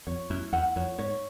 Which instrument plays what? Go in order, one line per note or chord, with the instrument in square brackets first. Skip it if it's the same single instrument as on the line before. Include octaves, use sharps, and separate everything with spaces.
[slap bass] F2 [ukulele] C#5
[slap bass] F#2 [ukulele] E4
[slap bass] E2 [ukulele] F#5
[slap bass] F2 [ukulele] C#5
[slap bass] G#2 [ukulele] C#5